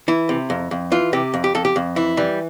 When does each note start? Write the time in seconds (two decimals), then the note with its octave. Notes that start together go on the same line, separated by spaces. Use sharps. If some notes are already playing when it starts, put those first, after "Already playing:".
0.08 E3 E4
0.29 C3
0.50 F2
0.71 F2
0.92 E3 F4
1.13 C3 G4
1.34 F2
1.44 G4
1.55 F2 A4
1.65 G4
1.76 F2
1.96 E3 E4
2.17 E3 G3